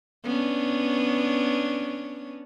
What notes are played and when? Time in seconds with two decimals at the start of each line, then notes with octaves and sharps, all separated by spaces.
0.24 B3 C#4 D4